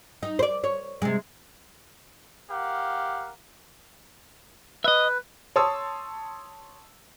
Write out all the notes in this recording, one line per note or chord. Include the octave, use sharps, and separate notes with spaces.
D#4
C5 D5
C#5
C3 G#3
G4 A#4 F5 F#5
B4 D#5 E5
C#5 A5 C6 D#6 E6